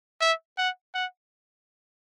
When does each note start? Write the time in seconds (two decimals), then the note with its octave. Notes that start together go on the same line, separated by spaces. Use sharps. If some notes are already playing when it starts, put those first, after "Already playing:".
0.21 E5
0.58 F#5
0.94 F#5